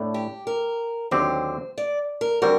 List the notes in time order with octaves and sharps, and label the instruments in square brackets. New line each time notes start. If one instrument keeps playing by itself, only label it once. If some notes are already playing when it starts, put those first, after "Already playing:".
Already playing: [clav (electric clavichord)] A2 A3 D4
[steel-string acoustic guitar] G4
A#4
[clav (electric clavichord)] D#2 D3 F#3 C4 G4 [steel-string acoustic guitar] C5
[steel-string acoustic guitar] D5
A#4
[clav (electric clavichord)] D3 G3 C4 F#4 [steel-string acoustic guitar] A#4